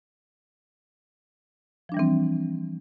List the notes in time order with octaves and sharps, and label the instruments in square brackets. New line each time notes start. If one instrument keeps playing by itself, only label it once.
[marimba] F3
D4
G3
E3
C4